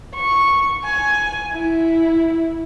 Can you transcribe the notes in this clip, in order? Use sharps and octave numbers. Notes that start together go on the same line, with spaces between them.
C#6
G#5
E4